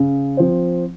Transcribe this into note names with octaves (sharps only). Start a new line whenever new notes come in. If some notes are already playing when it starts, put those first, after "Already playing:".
Already playing: C#3
F3 C4